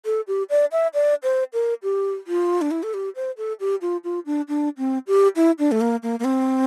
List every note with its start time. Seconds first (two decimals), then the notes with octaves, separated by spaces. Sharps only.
0.05 A4
0.27 G4
0.50 D5
0.72 E5
0.94 D5
1.23 C5
1.53 A#4
1.83 G4
2.27 F4
2.61 D4
2.71 E4
2.83 A4
2.94 G4
3.16 C5
3.37 A4
3.60 G4
3.81 F4
4.04 F4
4.26 D4
4.48 D4
4.78 C4
5.07 G4
5.36 E4
5.59 D4
5.71 A3
5.81 A#3
6.03 A#3
6.19 A#3
6.24 C4